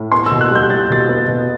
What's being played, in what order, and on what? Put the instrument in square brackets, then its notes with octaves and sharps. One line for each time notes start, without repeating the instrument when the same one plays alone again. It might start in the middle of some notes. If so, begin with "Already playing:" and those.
Already playing: [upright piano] A2
[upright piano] B3 [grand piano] C6
[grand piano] E6
[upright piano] B2
[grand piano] F#6
[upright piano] G3 [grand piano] G6
[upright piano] G3 [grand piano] A6
[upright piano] B2 [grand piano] A6
[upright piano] B3
B2